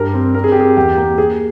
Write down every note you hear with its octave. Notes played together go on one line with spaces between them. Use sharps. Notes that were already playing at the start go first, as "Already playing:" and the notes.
Already playing: G2 G3 A#4
C4
C4 A#4
G#4
G4
C4 G#4
E2 G4
A#3
A#3 G#4